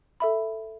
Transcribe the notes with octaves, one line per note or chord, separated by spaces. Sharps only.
A4 E5 B5